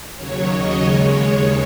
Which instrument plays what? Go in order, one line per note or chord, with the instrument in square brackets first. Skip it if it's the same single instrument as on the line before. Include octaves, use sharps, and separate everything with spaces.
[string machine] D#2 C#3 F#3 C#5
D#5
D#2 C#3 G#3 C#5